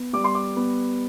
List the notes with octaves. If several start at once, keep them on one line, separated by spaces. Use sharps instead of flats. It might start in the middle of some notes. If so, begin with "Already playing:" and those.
Already playing: B3
G3 D6
C6
D6
B3